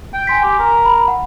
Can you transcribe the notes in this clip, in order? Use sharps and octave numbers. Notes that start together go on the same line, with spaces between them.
G5
G#5 C6 B6
G4
A#4
B5
F#5